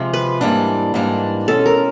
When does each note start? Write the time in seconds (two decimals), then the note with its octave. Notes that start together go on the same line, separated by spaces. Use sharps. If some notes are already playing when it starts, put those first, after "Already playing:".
Already playing: C3 F3 G#3 C4
0.14 B4
0.41 G#2 E3 G3 A#3 D4
0.94 G#2 E3 G3 A#3 D4
1.48 B2 G#3 C#4 A4
1.66 A#4